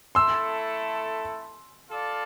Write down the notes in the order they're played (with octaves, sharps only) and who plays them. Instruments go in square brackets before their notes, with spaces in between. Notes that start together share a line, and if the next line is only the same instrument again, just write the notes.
[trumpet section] A3 E4 A4 [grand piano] C6 E6
[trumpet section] F4 A4 D5 F5